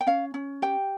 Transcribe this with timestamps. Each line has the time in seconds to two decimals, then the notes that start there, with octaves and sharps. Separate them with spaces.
0.01 G5
0.07 C#4 F5
0.34 C#4
0.62 G4 G5